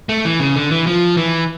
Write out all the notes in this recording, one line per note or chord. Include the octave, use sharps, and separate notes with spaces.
A3
E3
C#3
D3
E3
F3
E3